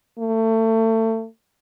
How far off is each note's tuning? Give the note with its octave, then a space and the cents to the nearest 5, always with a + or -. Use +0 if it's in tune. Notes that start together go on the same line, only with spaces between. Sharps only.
A3 +30